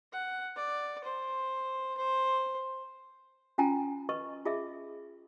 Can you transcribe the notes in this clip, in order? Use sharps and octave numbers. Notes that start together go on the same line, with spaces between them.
F#5
D5
C5
C5
C#4 F4 G5 G#5 A#5
B4 D#5 C#6
F4 G#4 D#5 E5